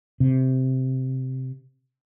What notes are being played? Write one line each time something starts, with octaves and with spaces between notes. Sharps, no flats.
C3